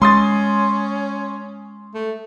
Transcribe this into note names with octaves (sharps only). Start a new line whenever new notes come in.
G#3 C#4 C6 D#6 A6
A3